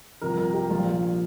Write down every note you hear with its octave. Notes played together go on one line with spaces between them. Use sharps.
C2 C3 F3 A#4
A#4
G4
A#1 A#2 F3 F4